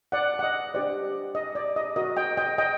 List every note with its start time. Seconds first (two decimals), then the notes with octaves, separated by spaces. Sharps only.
0.12 D5 F#5
0.39 F#5
0.43 D#5
0.74 D4 G4 C5 D5
1.35 D#5
1.55 D5
1.76 D#5
1.96 F#4 A#4 D#5
2.17 D#5 G5
2.37 D#5 G5
2.58 D#5 G5